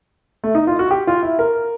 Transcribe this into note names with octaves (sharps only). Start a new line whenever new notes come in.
A3
D#4
F4
F#4
G4
F4
E4
A#4